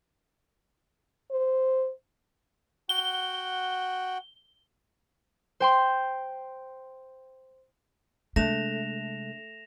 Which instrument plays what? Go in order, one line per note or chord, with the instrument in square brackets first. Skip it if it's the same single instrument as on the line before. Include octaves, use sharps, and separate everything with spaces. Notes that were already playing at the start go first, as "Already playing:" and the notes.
[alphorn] C5
[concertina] F#4 F#5 G5 [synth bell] G7
[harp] C5 G5 C6
[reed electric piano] C3 G#3 F#6 [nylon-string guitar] A3 [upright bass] D4 [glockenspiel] A#6 E7 F7